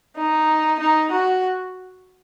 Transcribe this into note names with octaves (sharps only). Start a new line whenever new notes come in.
D#4
D#4
F#4